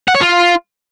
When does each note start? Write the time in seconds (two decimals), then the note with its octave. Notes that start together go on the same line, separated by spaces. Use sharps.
0.08 F#5
0.15 C#5
0.21 F4